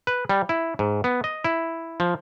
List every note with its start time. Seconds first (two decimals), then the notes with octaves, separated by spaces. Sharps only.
0.07 B4
0.29 G3
0.49 E4
0.79 G#2
1.04 B3
1.24 D#5
1.44 E4
2.00 F3